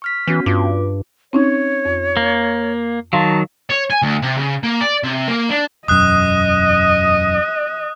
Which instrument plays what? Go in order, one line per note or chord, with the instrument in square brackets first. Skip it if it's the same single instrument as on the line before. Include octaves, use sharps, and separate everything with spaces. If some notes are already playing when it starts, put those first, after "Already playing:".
[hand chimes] C#6 F6 B6
[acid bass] E3 [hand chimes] B3 C#4 F#4
[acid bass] G2 [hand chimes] F4 D6
[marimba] C4 C#4 D#4 [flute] C#5
[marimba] F2
[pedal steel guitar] A#3
[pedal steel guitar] D#3 F#3 [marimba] F5 C6 [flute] A5
[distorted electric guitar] C#5
G#5
D2
C3
C#3
A#3
D5
C3
A#3
D4
[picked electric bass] E1 F#2 [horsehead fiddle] D#5 [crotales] D#6 F#6